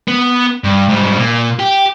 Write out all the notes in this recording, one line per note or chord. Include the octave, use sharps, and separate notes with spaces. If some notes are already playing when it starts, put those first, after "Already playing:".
B3
G2
G#2 G3
A#2
G4